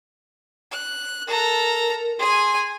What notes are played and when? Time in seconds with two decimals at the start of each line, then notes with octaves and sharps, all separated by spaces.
0.72 F#6
1.28 A4 A#4 A#5
2.19 G#4 G#5 C6